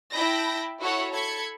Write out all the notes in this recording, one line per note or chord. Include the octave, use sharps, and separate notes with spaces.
E4 G5 A5 B5 G6 A#6
E4 F#4 A4 C#5 F#5
A4 B5 G#6 C#7